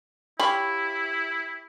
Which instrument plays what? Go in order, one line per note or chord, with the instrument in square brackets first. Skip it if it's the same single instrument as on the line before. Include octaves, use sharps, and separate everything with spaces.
[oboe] E4 [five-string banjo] G4 C#5 F5 [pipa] B5